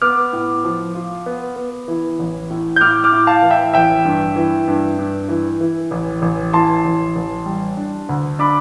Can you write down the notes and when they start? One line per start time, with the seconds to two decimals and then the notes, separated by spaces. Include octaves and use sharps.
0.02 B3 D6 F6
0.33 A2
0.64 F3
0.95 F4
1.26 B3
1.56 B3
1.88 E3
2.19 A1
2.50 A2
2.76 G6
2.81 A2 D6 F6
3.04 D6 F6
3.12 A2
3.27 F5 A5
3.42 E3
3.51 E5 G5
3.73 A1 E5 G5
4.05 G2
4.36 E3
4.68 G2
4.98 G2
5.29 E3
5.61 E3
5.91 A1
6.22 A1
6.53 E3 A5 C6
6.85 A1
7.16 A1
7.46 G3
7.77 D4
8.09 D2
8.39 D4 B5 D6